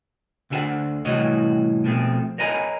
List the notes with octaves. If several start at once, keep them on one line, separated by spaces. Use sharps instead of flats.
D2 D3 E4 G#4 C5 F#5
C2 A2 E3 F#4 C#5 D#5
B2 F3 A3 C4
A#4 C#5 D#5 G#5 A#5 B5